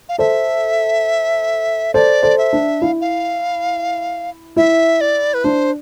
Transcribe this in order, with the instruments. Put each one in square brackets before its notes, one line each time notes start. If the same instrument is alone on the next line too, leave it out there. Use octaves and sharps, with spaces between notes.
[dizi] F5
[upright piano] A4 C5 [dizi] E5
[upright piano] A4 C5 [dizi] D5
[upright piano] A4 C5
[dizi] E5
[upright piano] D4
[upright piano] E4 [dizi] F5
[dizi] F5
[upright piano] E4 [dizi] E5
[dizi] D5
B4
[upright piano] D4 [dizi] C5